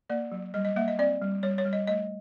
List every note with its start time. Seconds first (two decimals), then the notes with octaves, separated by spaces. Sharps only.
0.10 A#3 D5
0.32 F#3
0.54 G3 D#5
0.65 D#5
0.76 A#3 E5
0.88 D#5
0.99 C4 D5
1.22 G3
1.43 G3 C#5
1.58 C#5
1.65 G3
1.73 D#5
1.88 A3 D#5